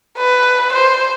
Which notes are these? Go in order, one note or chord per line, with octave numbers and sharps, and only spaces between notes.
B4
C5